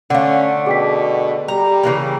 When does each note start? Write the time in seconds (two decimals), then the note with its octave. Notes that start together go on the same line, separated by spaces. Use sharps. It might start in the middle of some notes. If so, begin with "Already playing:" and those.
0.10 D3 A3 C#4 F5 F#5
0.67 B2 G#4 G5 B6
1.48 G3 G4 A#5
1.83 C#3 E3 A#3